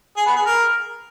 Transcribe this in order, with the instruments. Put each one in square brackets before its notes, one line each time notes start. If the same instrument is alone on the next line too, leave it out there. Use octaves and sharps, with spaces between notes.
[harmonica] G#4
B3
G#4
A#4